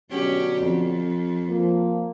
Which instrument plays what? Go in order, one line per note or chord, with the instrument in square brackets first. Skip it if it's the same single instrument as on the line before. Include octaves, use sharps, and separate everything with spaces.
[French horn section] B2 D3 F#3 [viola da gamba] C#4 G4
[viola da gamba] F2
[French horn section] F3 A#3